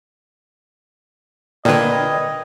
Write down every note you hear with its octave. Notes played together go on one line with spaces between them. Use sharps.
A#2 D3 A#4 B4 D5 D#5 G5 G#6